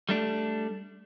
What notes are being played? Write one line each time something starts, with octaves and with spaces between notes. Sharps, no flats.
G3 A3 D4